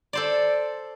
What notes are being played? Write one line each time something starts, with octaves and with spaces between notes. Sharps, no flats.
A4 C5 D5